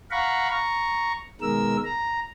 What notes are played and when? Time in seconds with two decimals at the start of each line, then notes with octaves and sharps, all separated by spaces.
0.11 F5 F#5 A#5 B5 C#6
0.49 A#5 C#6
1.41 B2 D#3 G#3 A#4 E6
1.84 A#5